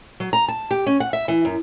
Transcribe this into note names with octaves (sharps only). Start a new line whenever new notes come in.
F#3
A#5
A5
G4
C#4
F#5
E5
E3
F#2